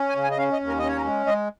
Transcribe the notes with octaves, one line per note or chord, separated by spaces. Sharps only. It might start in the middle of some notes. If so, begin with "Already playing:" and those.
Already playing: C#4
G#5
C#3
G#5
D#5
C#4 F5
D#5
D#2
A#4
C#4 D#5
C#5
A#4
G#3
G#3 D#5